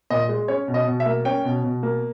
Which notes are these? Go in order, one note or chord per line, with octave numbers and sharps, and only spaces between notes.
A#2 D#5
G#3
C#4 C#5
B2
D#5
B2
E5
A#3
C#4 G5
B2
B2
A#3